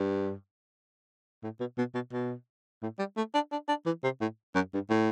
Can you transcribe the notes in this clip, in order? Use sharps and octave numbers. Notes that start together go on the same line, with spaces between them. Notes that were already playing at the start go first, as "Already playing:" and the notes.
Already playing: G2
A2
B2
B2
B2
B2
A2
G3
A3
D4
D4
D4
E3
C3
A2
F#2
G2
A2